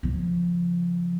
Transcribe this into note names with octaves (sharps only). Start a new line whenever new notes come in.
C#3 F3